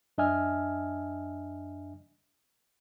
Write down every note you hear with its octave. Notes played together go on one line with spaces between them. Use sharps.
F#2 D4 D#5 E5 G#5 F6